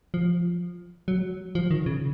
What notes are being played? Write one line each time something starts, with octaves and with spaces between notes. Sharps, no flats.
F3
F#3
F3
D#3
C#3